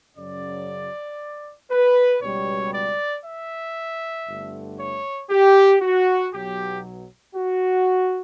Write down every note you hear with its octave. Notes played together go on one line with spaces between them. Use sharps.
F#2 C#3 F#3 D5
B4
C#2 B2 G3 C#5
D5
E5
G1 G2 D3 A3
C#5
G4
F#4
B1 B2 F#3 G4
F#4